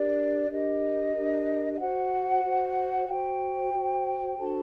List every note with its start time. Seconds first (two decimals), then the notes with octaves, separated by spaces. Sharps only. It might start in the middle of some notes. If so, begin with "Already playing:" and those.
Already playing: D4 G4 A#4 D5
0.50 D4 G4 A#4 D#5
1.14 D4 G4 A#4
1.73 D#5
1.79 F#4 C5 F#5
2.44 F#4 C5
3.08 F#4 C5 G5
3.72 F#4 C5
4.37 D4 F#4 A4 C5 A5